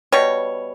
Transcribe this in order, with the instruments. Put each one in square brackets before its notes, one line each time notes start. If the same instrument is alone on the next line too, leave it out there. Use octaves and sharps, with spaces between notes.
[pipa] B2 G3 C#5